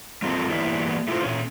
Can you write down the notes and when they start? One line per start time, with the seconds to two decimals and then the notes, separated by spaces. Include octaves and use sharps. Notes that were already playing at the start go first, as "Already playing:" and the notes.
0.22 G3 C4 F4 A4 A#4 D#5
0.50 E3 G3 A#3 B3 E4
1.08 A3 E4 F4 A#4 C5
1.24 A#2 C#4